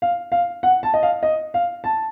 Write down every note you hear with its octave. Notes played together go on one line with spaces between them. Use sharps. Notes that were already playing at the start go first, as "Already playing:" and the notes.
F5
F5
F#5
A5
D#5
F5
D#5
F5
A5